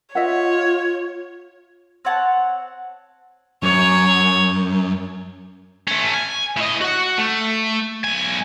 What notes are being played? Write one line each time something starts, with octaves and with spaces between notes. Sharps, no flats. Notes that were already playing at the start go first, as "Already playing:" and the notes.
F4 C#5 D#5 E5 F#5
C4 C#5 F#5 A5
F#2 C#5
A3 C#4
G#5
A2 D#5
F#4 F#5
A3
B1 G#5